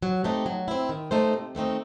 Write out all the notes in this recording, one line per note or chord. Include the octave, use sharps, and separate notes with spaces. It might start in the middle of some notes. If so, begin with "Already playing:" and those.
F#3
A3 C4 D#4 G4
F#3
C4 E4
D#3
A3 D#4 A4 C5
C3
D#3 A3 C4 D#4